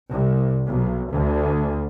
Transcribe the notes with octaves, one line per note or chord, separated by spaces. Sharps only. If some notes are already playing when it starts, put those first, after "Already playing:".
C2
B1
D2